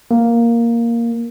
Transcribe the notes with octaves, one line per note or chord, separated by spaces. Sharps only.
A#3